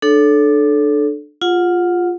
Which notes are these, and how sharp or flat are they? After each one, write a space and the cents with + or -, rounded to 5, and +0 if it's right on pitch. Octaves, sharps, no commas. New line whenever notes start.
D4 +25 A4 -15 C#5 +20
F4 +0 G#4 -30 F#5 -15